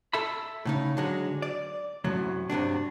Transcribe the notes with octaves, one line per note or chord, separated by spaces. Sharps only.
A4 E5 B5
A2 C#3 D#4
D3 F#3 G#3
D5
C2 F#2 A2 F#3
G2 C3 F#3 D4